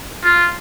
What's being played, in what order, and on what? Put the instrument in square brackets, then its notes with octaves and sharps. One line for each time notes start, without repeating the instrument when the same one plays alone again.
[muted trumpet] F4